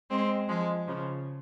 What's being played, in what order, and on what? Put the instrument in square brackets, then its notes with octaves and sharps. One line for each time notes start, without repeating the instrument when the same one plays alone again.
[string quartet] G#3 C4
F3 G#3
C#3 F3